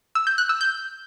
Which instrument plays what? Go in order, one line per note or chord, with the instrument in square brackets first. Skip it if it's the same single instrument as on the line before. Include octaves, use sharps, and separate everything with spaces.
[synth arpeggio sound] E6
G6
F#6
E6
G6